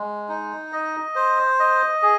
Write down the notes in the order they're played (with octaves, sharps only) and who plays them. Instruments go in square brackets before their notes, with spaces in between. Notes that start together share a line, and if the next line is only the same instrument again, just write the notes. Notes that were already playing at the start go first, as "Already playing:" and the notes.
Already playing: [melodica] G#3
D#4
D#5
C5
D#5
G#4